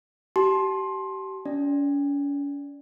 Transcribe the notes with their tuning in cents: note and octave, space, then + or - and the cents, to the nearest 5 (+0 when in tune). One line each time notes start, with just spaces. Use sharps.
G4 -35 A5 -25 C6 +15
C#4 +40 D5 +0